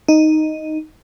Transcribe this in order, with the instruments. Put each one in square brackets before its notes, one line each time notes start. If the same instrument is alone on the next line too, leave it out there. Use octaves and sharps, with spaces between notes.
[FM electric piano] D#4